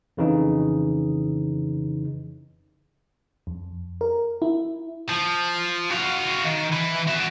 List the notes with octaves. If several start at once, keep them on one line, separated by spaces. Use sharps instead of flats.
F2 C#3 E3 D#4
F2
A#4
E4
F3
F#4 F5
D#3
E3 E4
F#4 E5